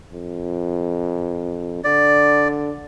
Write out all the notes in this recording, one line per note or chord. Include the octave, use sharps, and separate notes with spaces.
F2
D3 D5